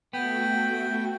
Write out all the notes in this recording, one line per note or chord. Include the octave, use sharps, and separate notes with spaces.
A3 B3 F#4 G5